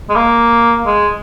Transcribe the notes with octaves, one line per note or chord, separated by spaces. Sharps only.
G#3
A#3
G#3